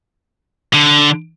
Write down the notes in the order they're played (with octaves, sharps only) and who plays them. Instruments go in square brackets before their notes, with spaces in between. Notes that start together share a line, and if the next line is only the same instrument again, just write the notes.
[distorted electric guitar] D3